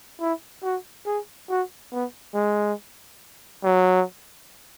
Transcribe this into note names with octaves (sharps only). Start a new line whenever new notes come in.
E4
F#4
G#4
F#4
B3
G#3
F#3